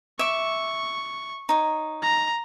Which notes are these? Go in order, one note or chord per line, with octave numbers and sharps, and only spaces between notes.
E5 C#6 D6
D#4 C#5
A#5